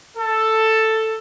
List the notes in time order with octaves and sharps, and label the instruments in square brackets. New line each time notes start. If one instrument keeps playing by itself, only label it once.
[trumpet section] A4